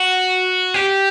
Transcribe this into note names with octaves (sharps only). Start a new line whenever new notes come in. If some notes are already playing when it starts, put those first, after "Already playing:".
Already playing: F#4
G4